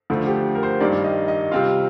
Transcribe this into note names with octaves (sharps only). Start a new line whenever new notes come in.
D2 D3 F3 A3
G4
A#4
C5
G2 D#3 G3 A#3 D5
D#5
D#5
C3 G3 C4 F4 F5